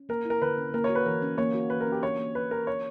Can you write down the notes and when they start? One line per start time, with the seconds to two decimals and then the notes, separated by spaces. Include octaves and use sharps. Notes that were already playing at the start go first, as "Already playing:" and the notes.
Already playing: C#4
0.09 A#3 A#4
0.25 E4
0.30 A#4
0.41 D3 B4
0.58 C#4
0.74 A#3 A#4
0.84 C#5
0.89 F#4
0.95 B4
1.06 E3 A#4
1.22 C#4
1.38 A#3 C#5
1.54 F#4
1.70 E3 B4
1.81 A#4
1.87 C#4
1.92 G4
2.03 D4 C#5
2.19 A#3
2.35 A#3 B4
2.51 G4 A#4
2.67 D4 C#5